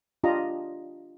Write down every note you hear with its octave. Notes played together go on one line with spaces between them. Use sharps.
D4 F4 G4 D#5 A#5